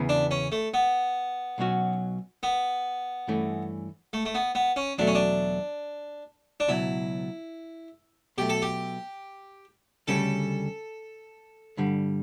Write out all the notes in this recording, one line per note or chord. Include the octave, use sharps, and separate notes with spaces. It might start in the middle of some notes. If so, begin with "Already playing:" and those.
Already playing: E2 C#3 E3 B3
D4
C#4
A3
B3
B1 B2 F#3 C#4 F#4
B3
G2 E3 A3 C#4
A3
A3
B3
B3
C#4
E2 B2 F#3 A3 D4
C#4
D4
D4
C#2 B2 F#3 E4
B2 F#3 A3 G4
A4
G4
D2 C#3 G3 C#4 A4
G2 D3 G3